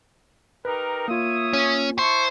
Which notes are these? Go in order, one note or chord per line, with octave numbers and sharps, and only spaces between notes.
D#4 G4 A#4 B4
A#3 F4 C#5 E5 D#6
C#4
E4 C5 A5 C#6